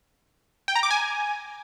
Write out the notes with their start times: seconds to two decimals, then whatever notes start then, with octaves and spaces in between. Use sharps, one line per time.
0.68 G5
0.76 A#5
0.83 D6
0.91 G#5